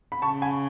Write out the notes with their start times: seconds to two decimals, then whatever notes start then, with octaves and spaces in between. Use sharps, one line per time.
0.12 B5
0.22 C#3 A5 C#6
0.42 G#5 B5